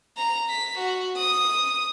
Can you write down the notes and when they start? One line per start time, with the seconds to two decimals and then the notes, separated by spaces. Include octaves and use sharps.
0.17 A#5
0.49 B6
0.78 F#4
1.17 D#6